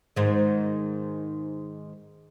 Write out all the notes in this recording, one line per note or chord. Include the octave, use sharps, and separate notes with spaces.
G#2 D#3